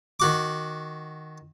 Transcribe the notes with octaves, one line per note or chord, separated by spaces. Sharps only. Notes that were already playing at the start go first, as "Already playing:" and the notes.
D#3 F#4 D6